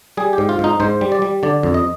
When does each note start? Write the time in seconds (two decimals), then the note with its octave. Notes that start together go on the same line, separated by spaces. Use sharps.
0.17 G3 G#4
0.33 G4
0.38 G#2
0.49 F4
0.59 G#2 D#4
0.80 G#2 C5
1.01 G3
1.12 D5
1.22 G3
1.43 D3 D5
1.63 F2
1.74 D#5